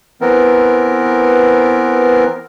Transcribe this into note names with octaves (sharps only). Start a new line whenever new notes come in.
E3 B3 C4 A#4